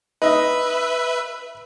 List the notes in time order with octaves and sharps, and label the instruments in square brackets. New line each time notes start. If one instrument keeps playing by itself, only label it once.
[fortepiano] D#4 D#5 [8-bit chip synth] B4 E5